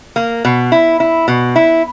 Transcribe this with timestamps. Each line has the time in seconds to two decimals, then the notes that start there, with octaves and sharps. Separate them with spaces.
0.16 A#3
0.45 B2
0.72 E4
1.00 E4
1.28 B2
1.56 E4